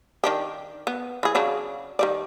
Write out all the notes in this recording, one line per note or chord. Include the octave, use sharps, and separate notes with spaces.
D#3 D4 G4
B3
E3 G#4
C#3 F#3 D4
D#3 G3 D5